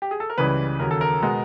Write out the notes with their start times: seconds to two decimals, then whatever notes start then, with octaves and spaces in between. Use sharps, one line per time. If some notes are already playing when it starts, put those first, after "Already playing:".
0.02 G4
0.11 G#4
0.20 A4
0.30 A#4
0.38 C#2 C#3 E3 G3 B4
0.80 D#2 C#3 F#3 A#4
0.91 A4
1.01 A#4
1.22 B2 G#3